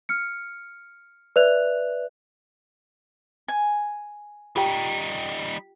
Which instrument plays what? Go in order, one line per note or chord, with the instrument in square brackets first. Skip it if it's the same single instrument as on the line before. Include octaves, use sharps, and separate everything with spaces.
[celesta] F6 C#7
B4 D5 E5 F#6 F7
[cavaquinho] G#5
[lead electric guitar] G3 D#4 [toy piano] F4 G4 G5